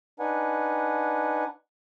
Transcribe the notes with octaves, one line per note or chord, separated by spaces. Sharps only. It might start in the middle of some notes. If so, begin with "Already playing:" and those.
D4 D#4 B4 F#5 G#5